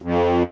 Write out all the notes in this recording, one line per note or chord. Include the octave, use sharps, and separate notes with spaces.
F2